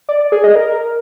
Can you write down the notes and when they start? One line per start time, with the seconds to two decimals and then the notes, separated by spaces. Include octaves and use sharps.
0.09 D5
0.20 D5
0.32 G#4
0.44 D#5
0.56 A#4